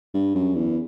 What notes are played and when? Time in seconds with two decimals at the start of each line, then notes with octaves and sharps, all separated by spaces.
0.14 G2
0.35 F#2
0.55 E2